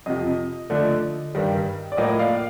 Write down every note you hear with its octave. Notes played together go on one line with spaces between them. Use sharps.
F2 C3 F3 D#5
D3 F3 A3 D4
G2 D#3 G3
D5
A2 F3 A#3 D#5
D5 F5